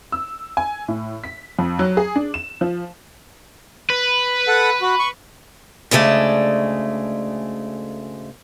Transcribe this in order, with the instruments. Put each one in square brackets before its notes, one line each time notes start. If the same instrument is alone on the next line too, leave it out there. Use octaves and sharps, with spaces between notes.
[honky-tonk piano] E6
G#5
A2
B6
F2
F#3
G#4
D4
E7
F3
[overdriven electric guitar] B4
[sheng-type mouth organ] A4 F#5
F#4
C#6
[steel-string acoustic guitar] D2 C#3 G#3 A3 D5